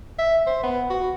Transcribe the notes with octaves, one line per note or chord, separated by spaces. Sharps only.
E5
C5
B3
F#4